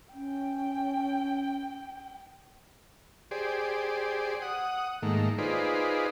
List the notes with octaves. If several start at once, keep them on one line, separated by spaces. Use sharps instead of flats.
C#4 G5
G4 G#4 C5 D5
F#5 D#6
G#2 D#3 A3 A#3
D#4 F4 G#4 B4 C5 D5